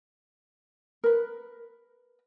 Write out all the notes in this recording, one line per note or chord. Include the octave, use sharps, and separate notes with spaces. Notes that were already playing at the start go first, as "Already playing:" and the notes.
A#4 B4